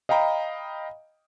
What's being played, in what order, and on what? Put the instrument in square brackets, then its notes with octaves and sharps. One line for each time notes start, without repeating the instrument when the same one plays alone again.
[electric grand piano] D#5 F5 G5 A#5 B5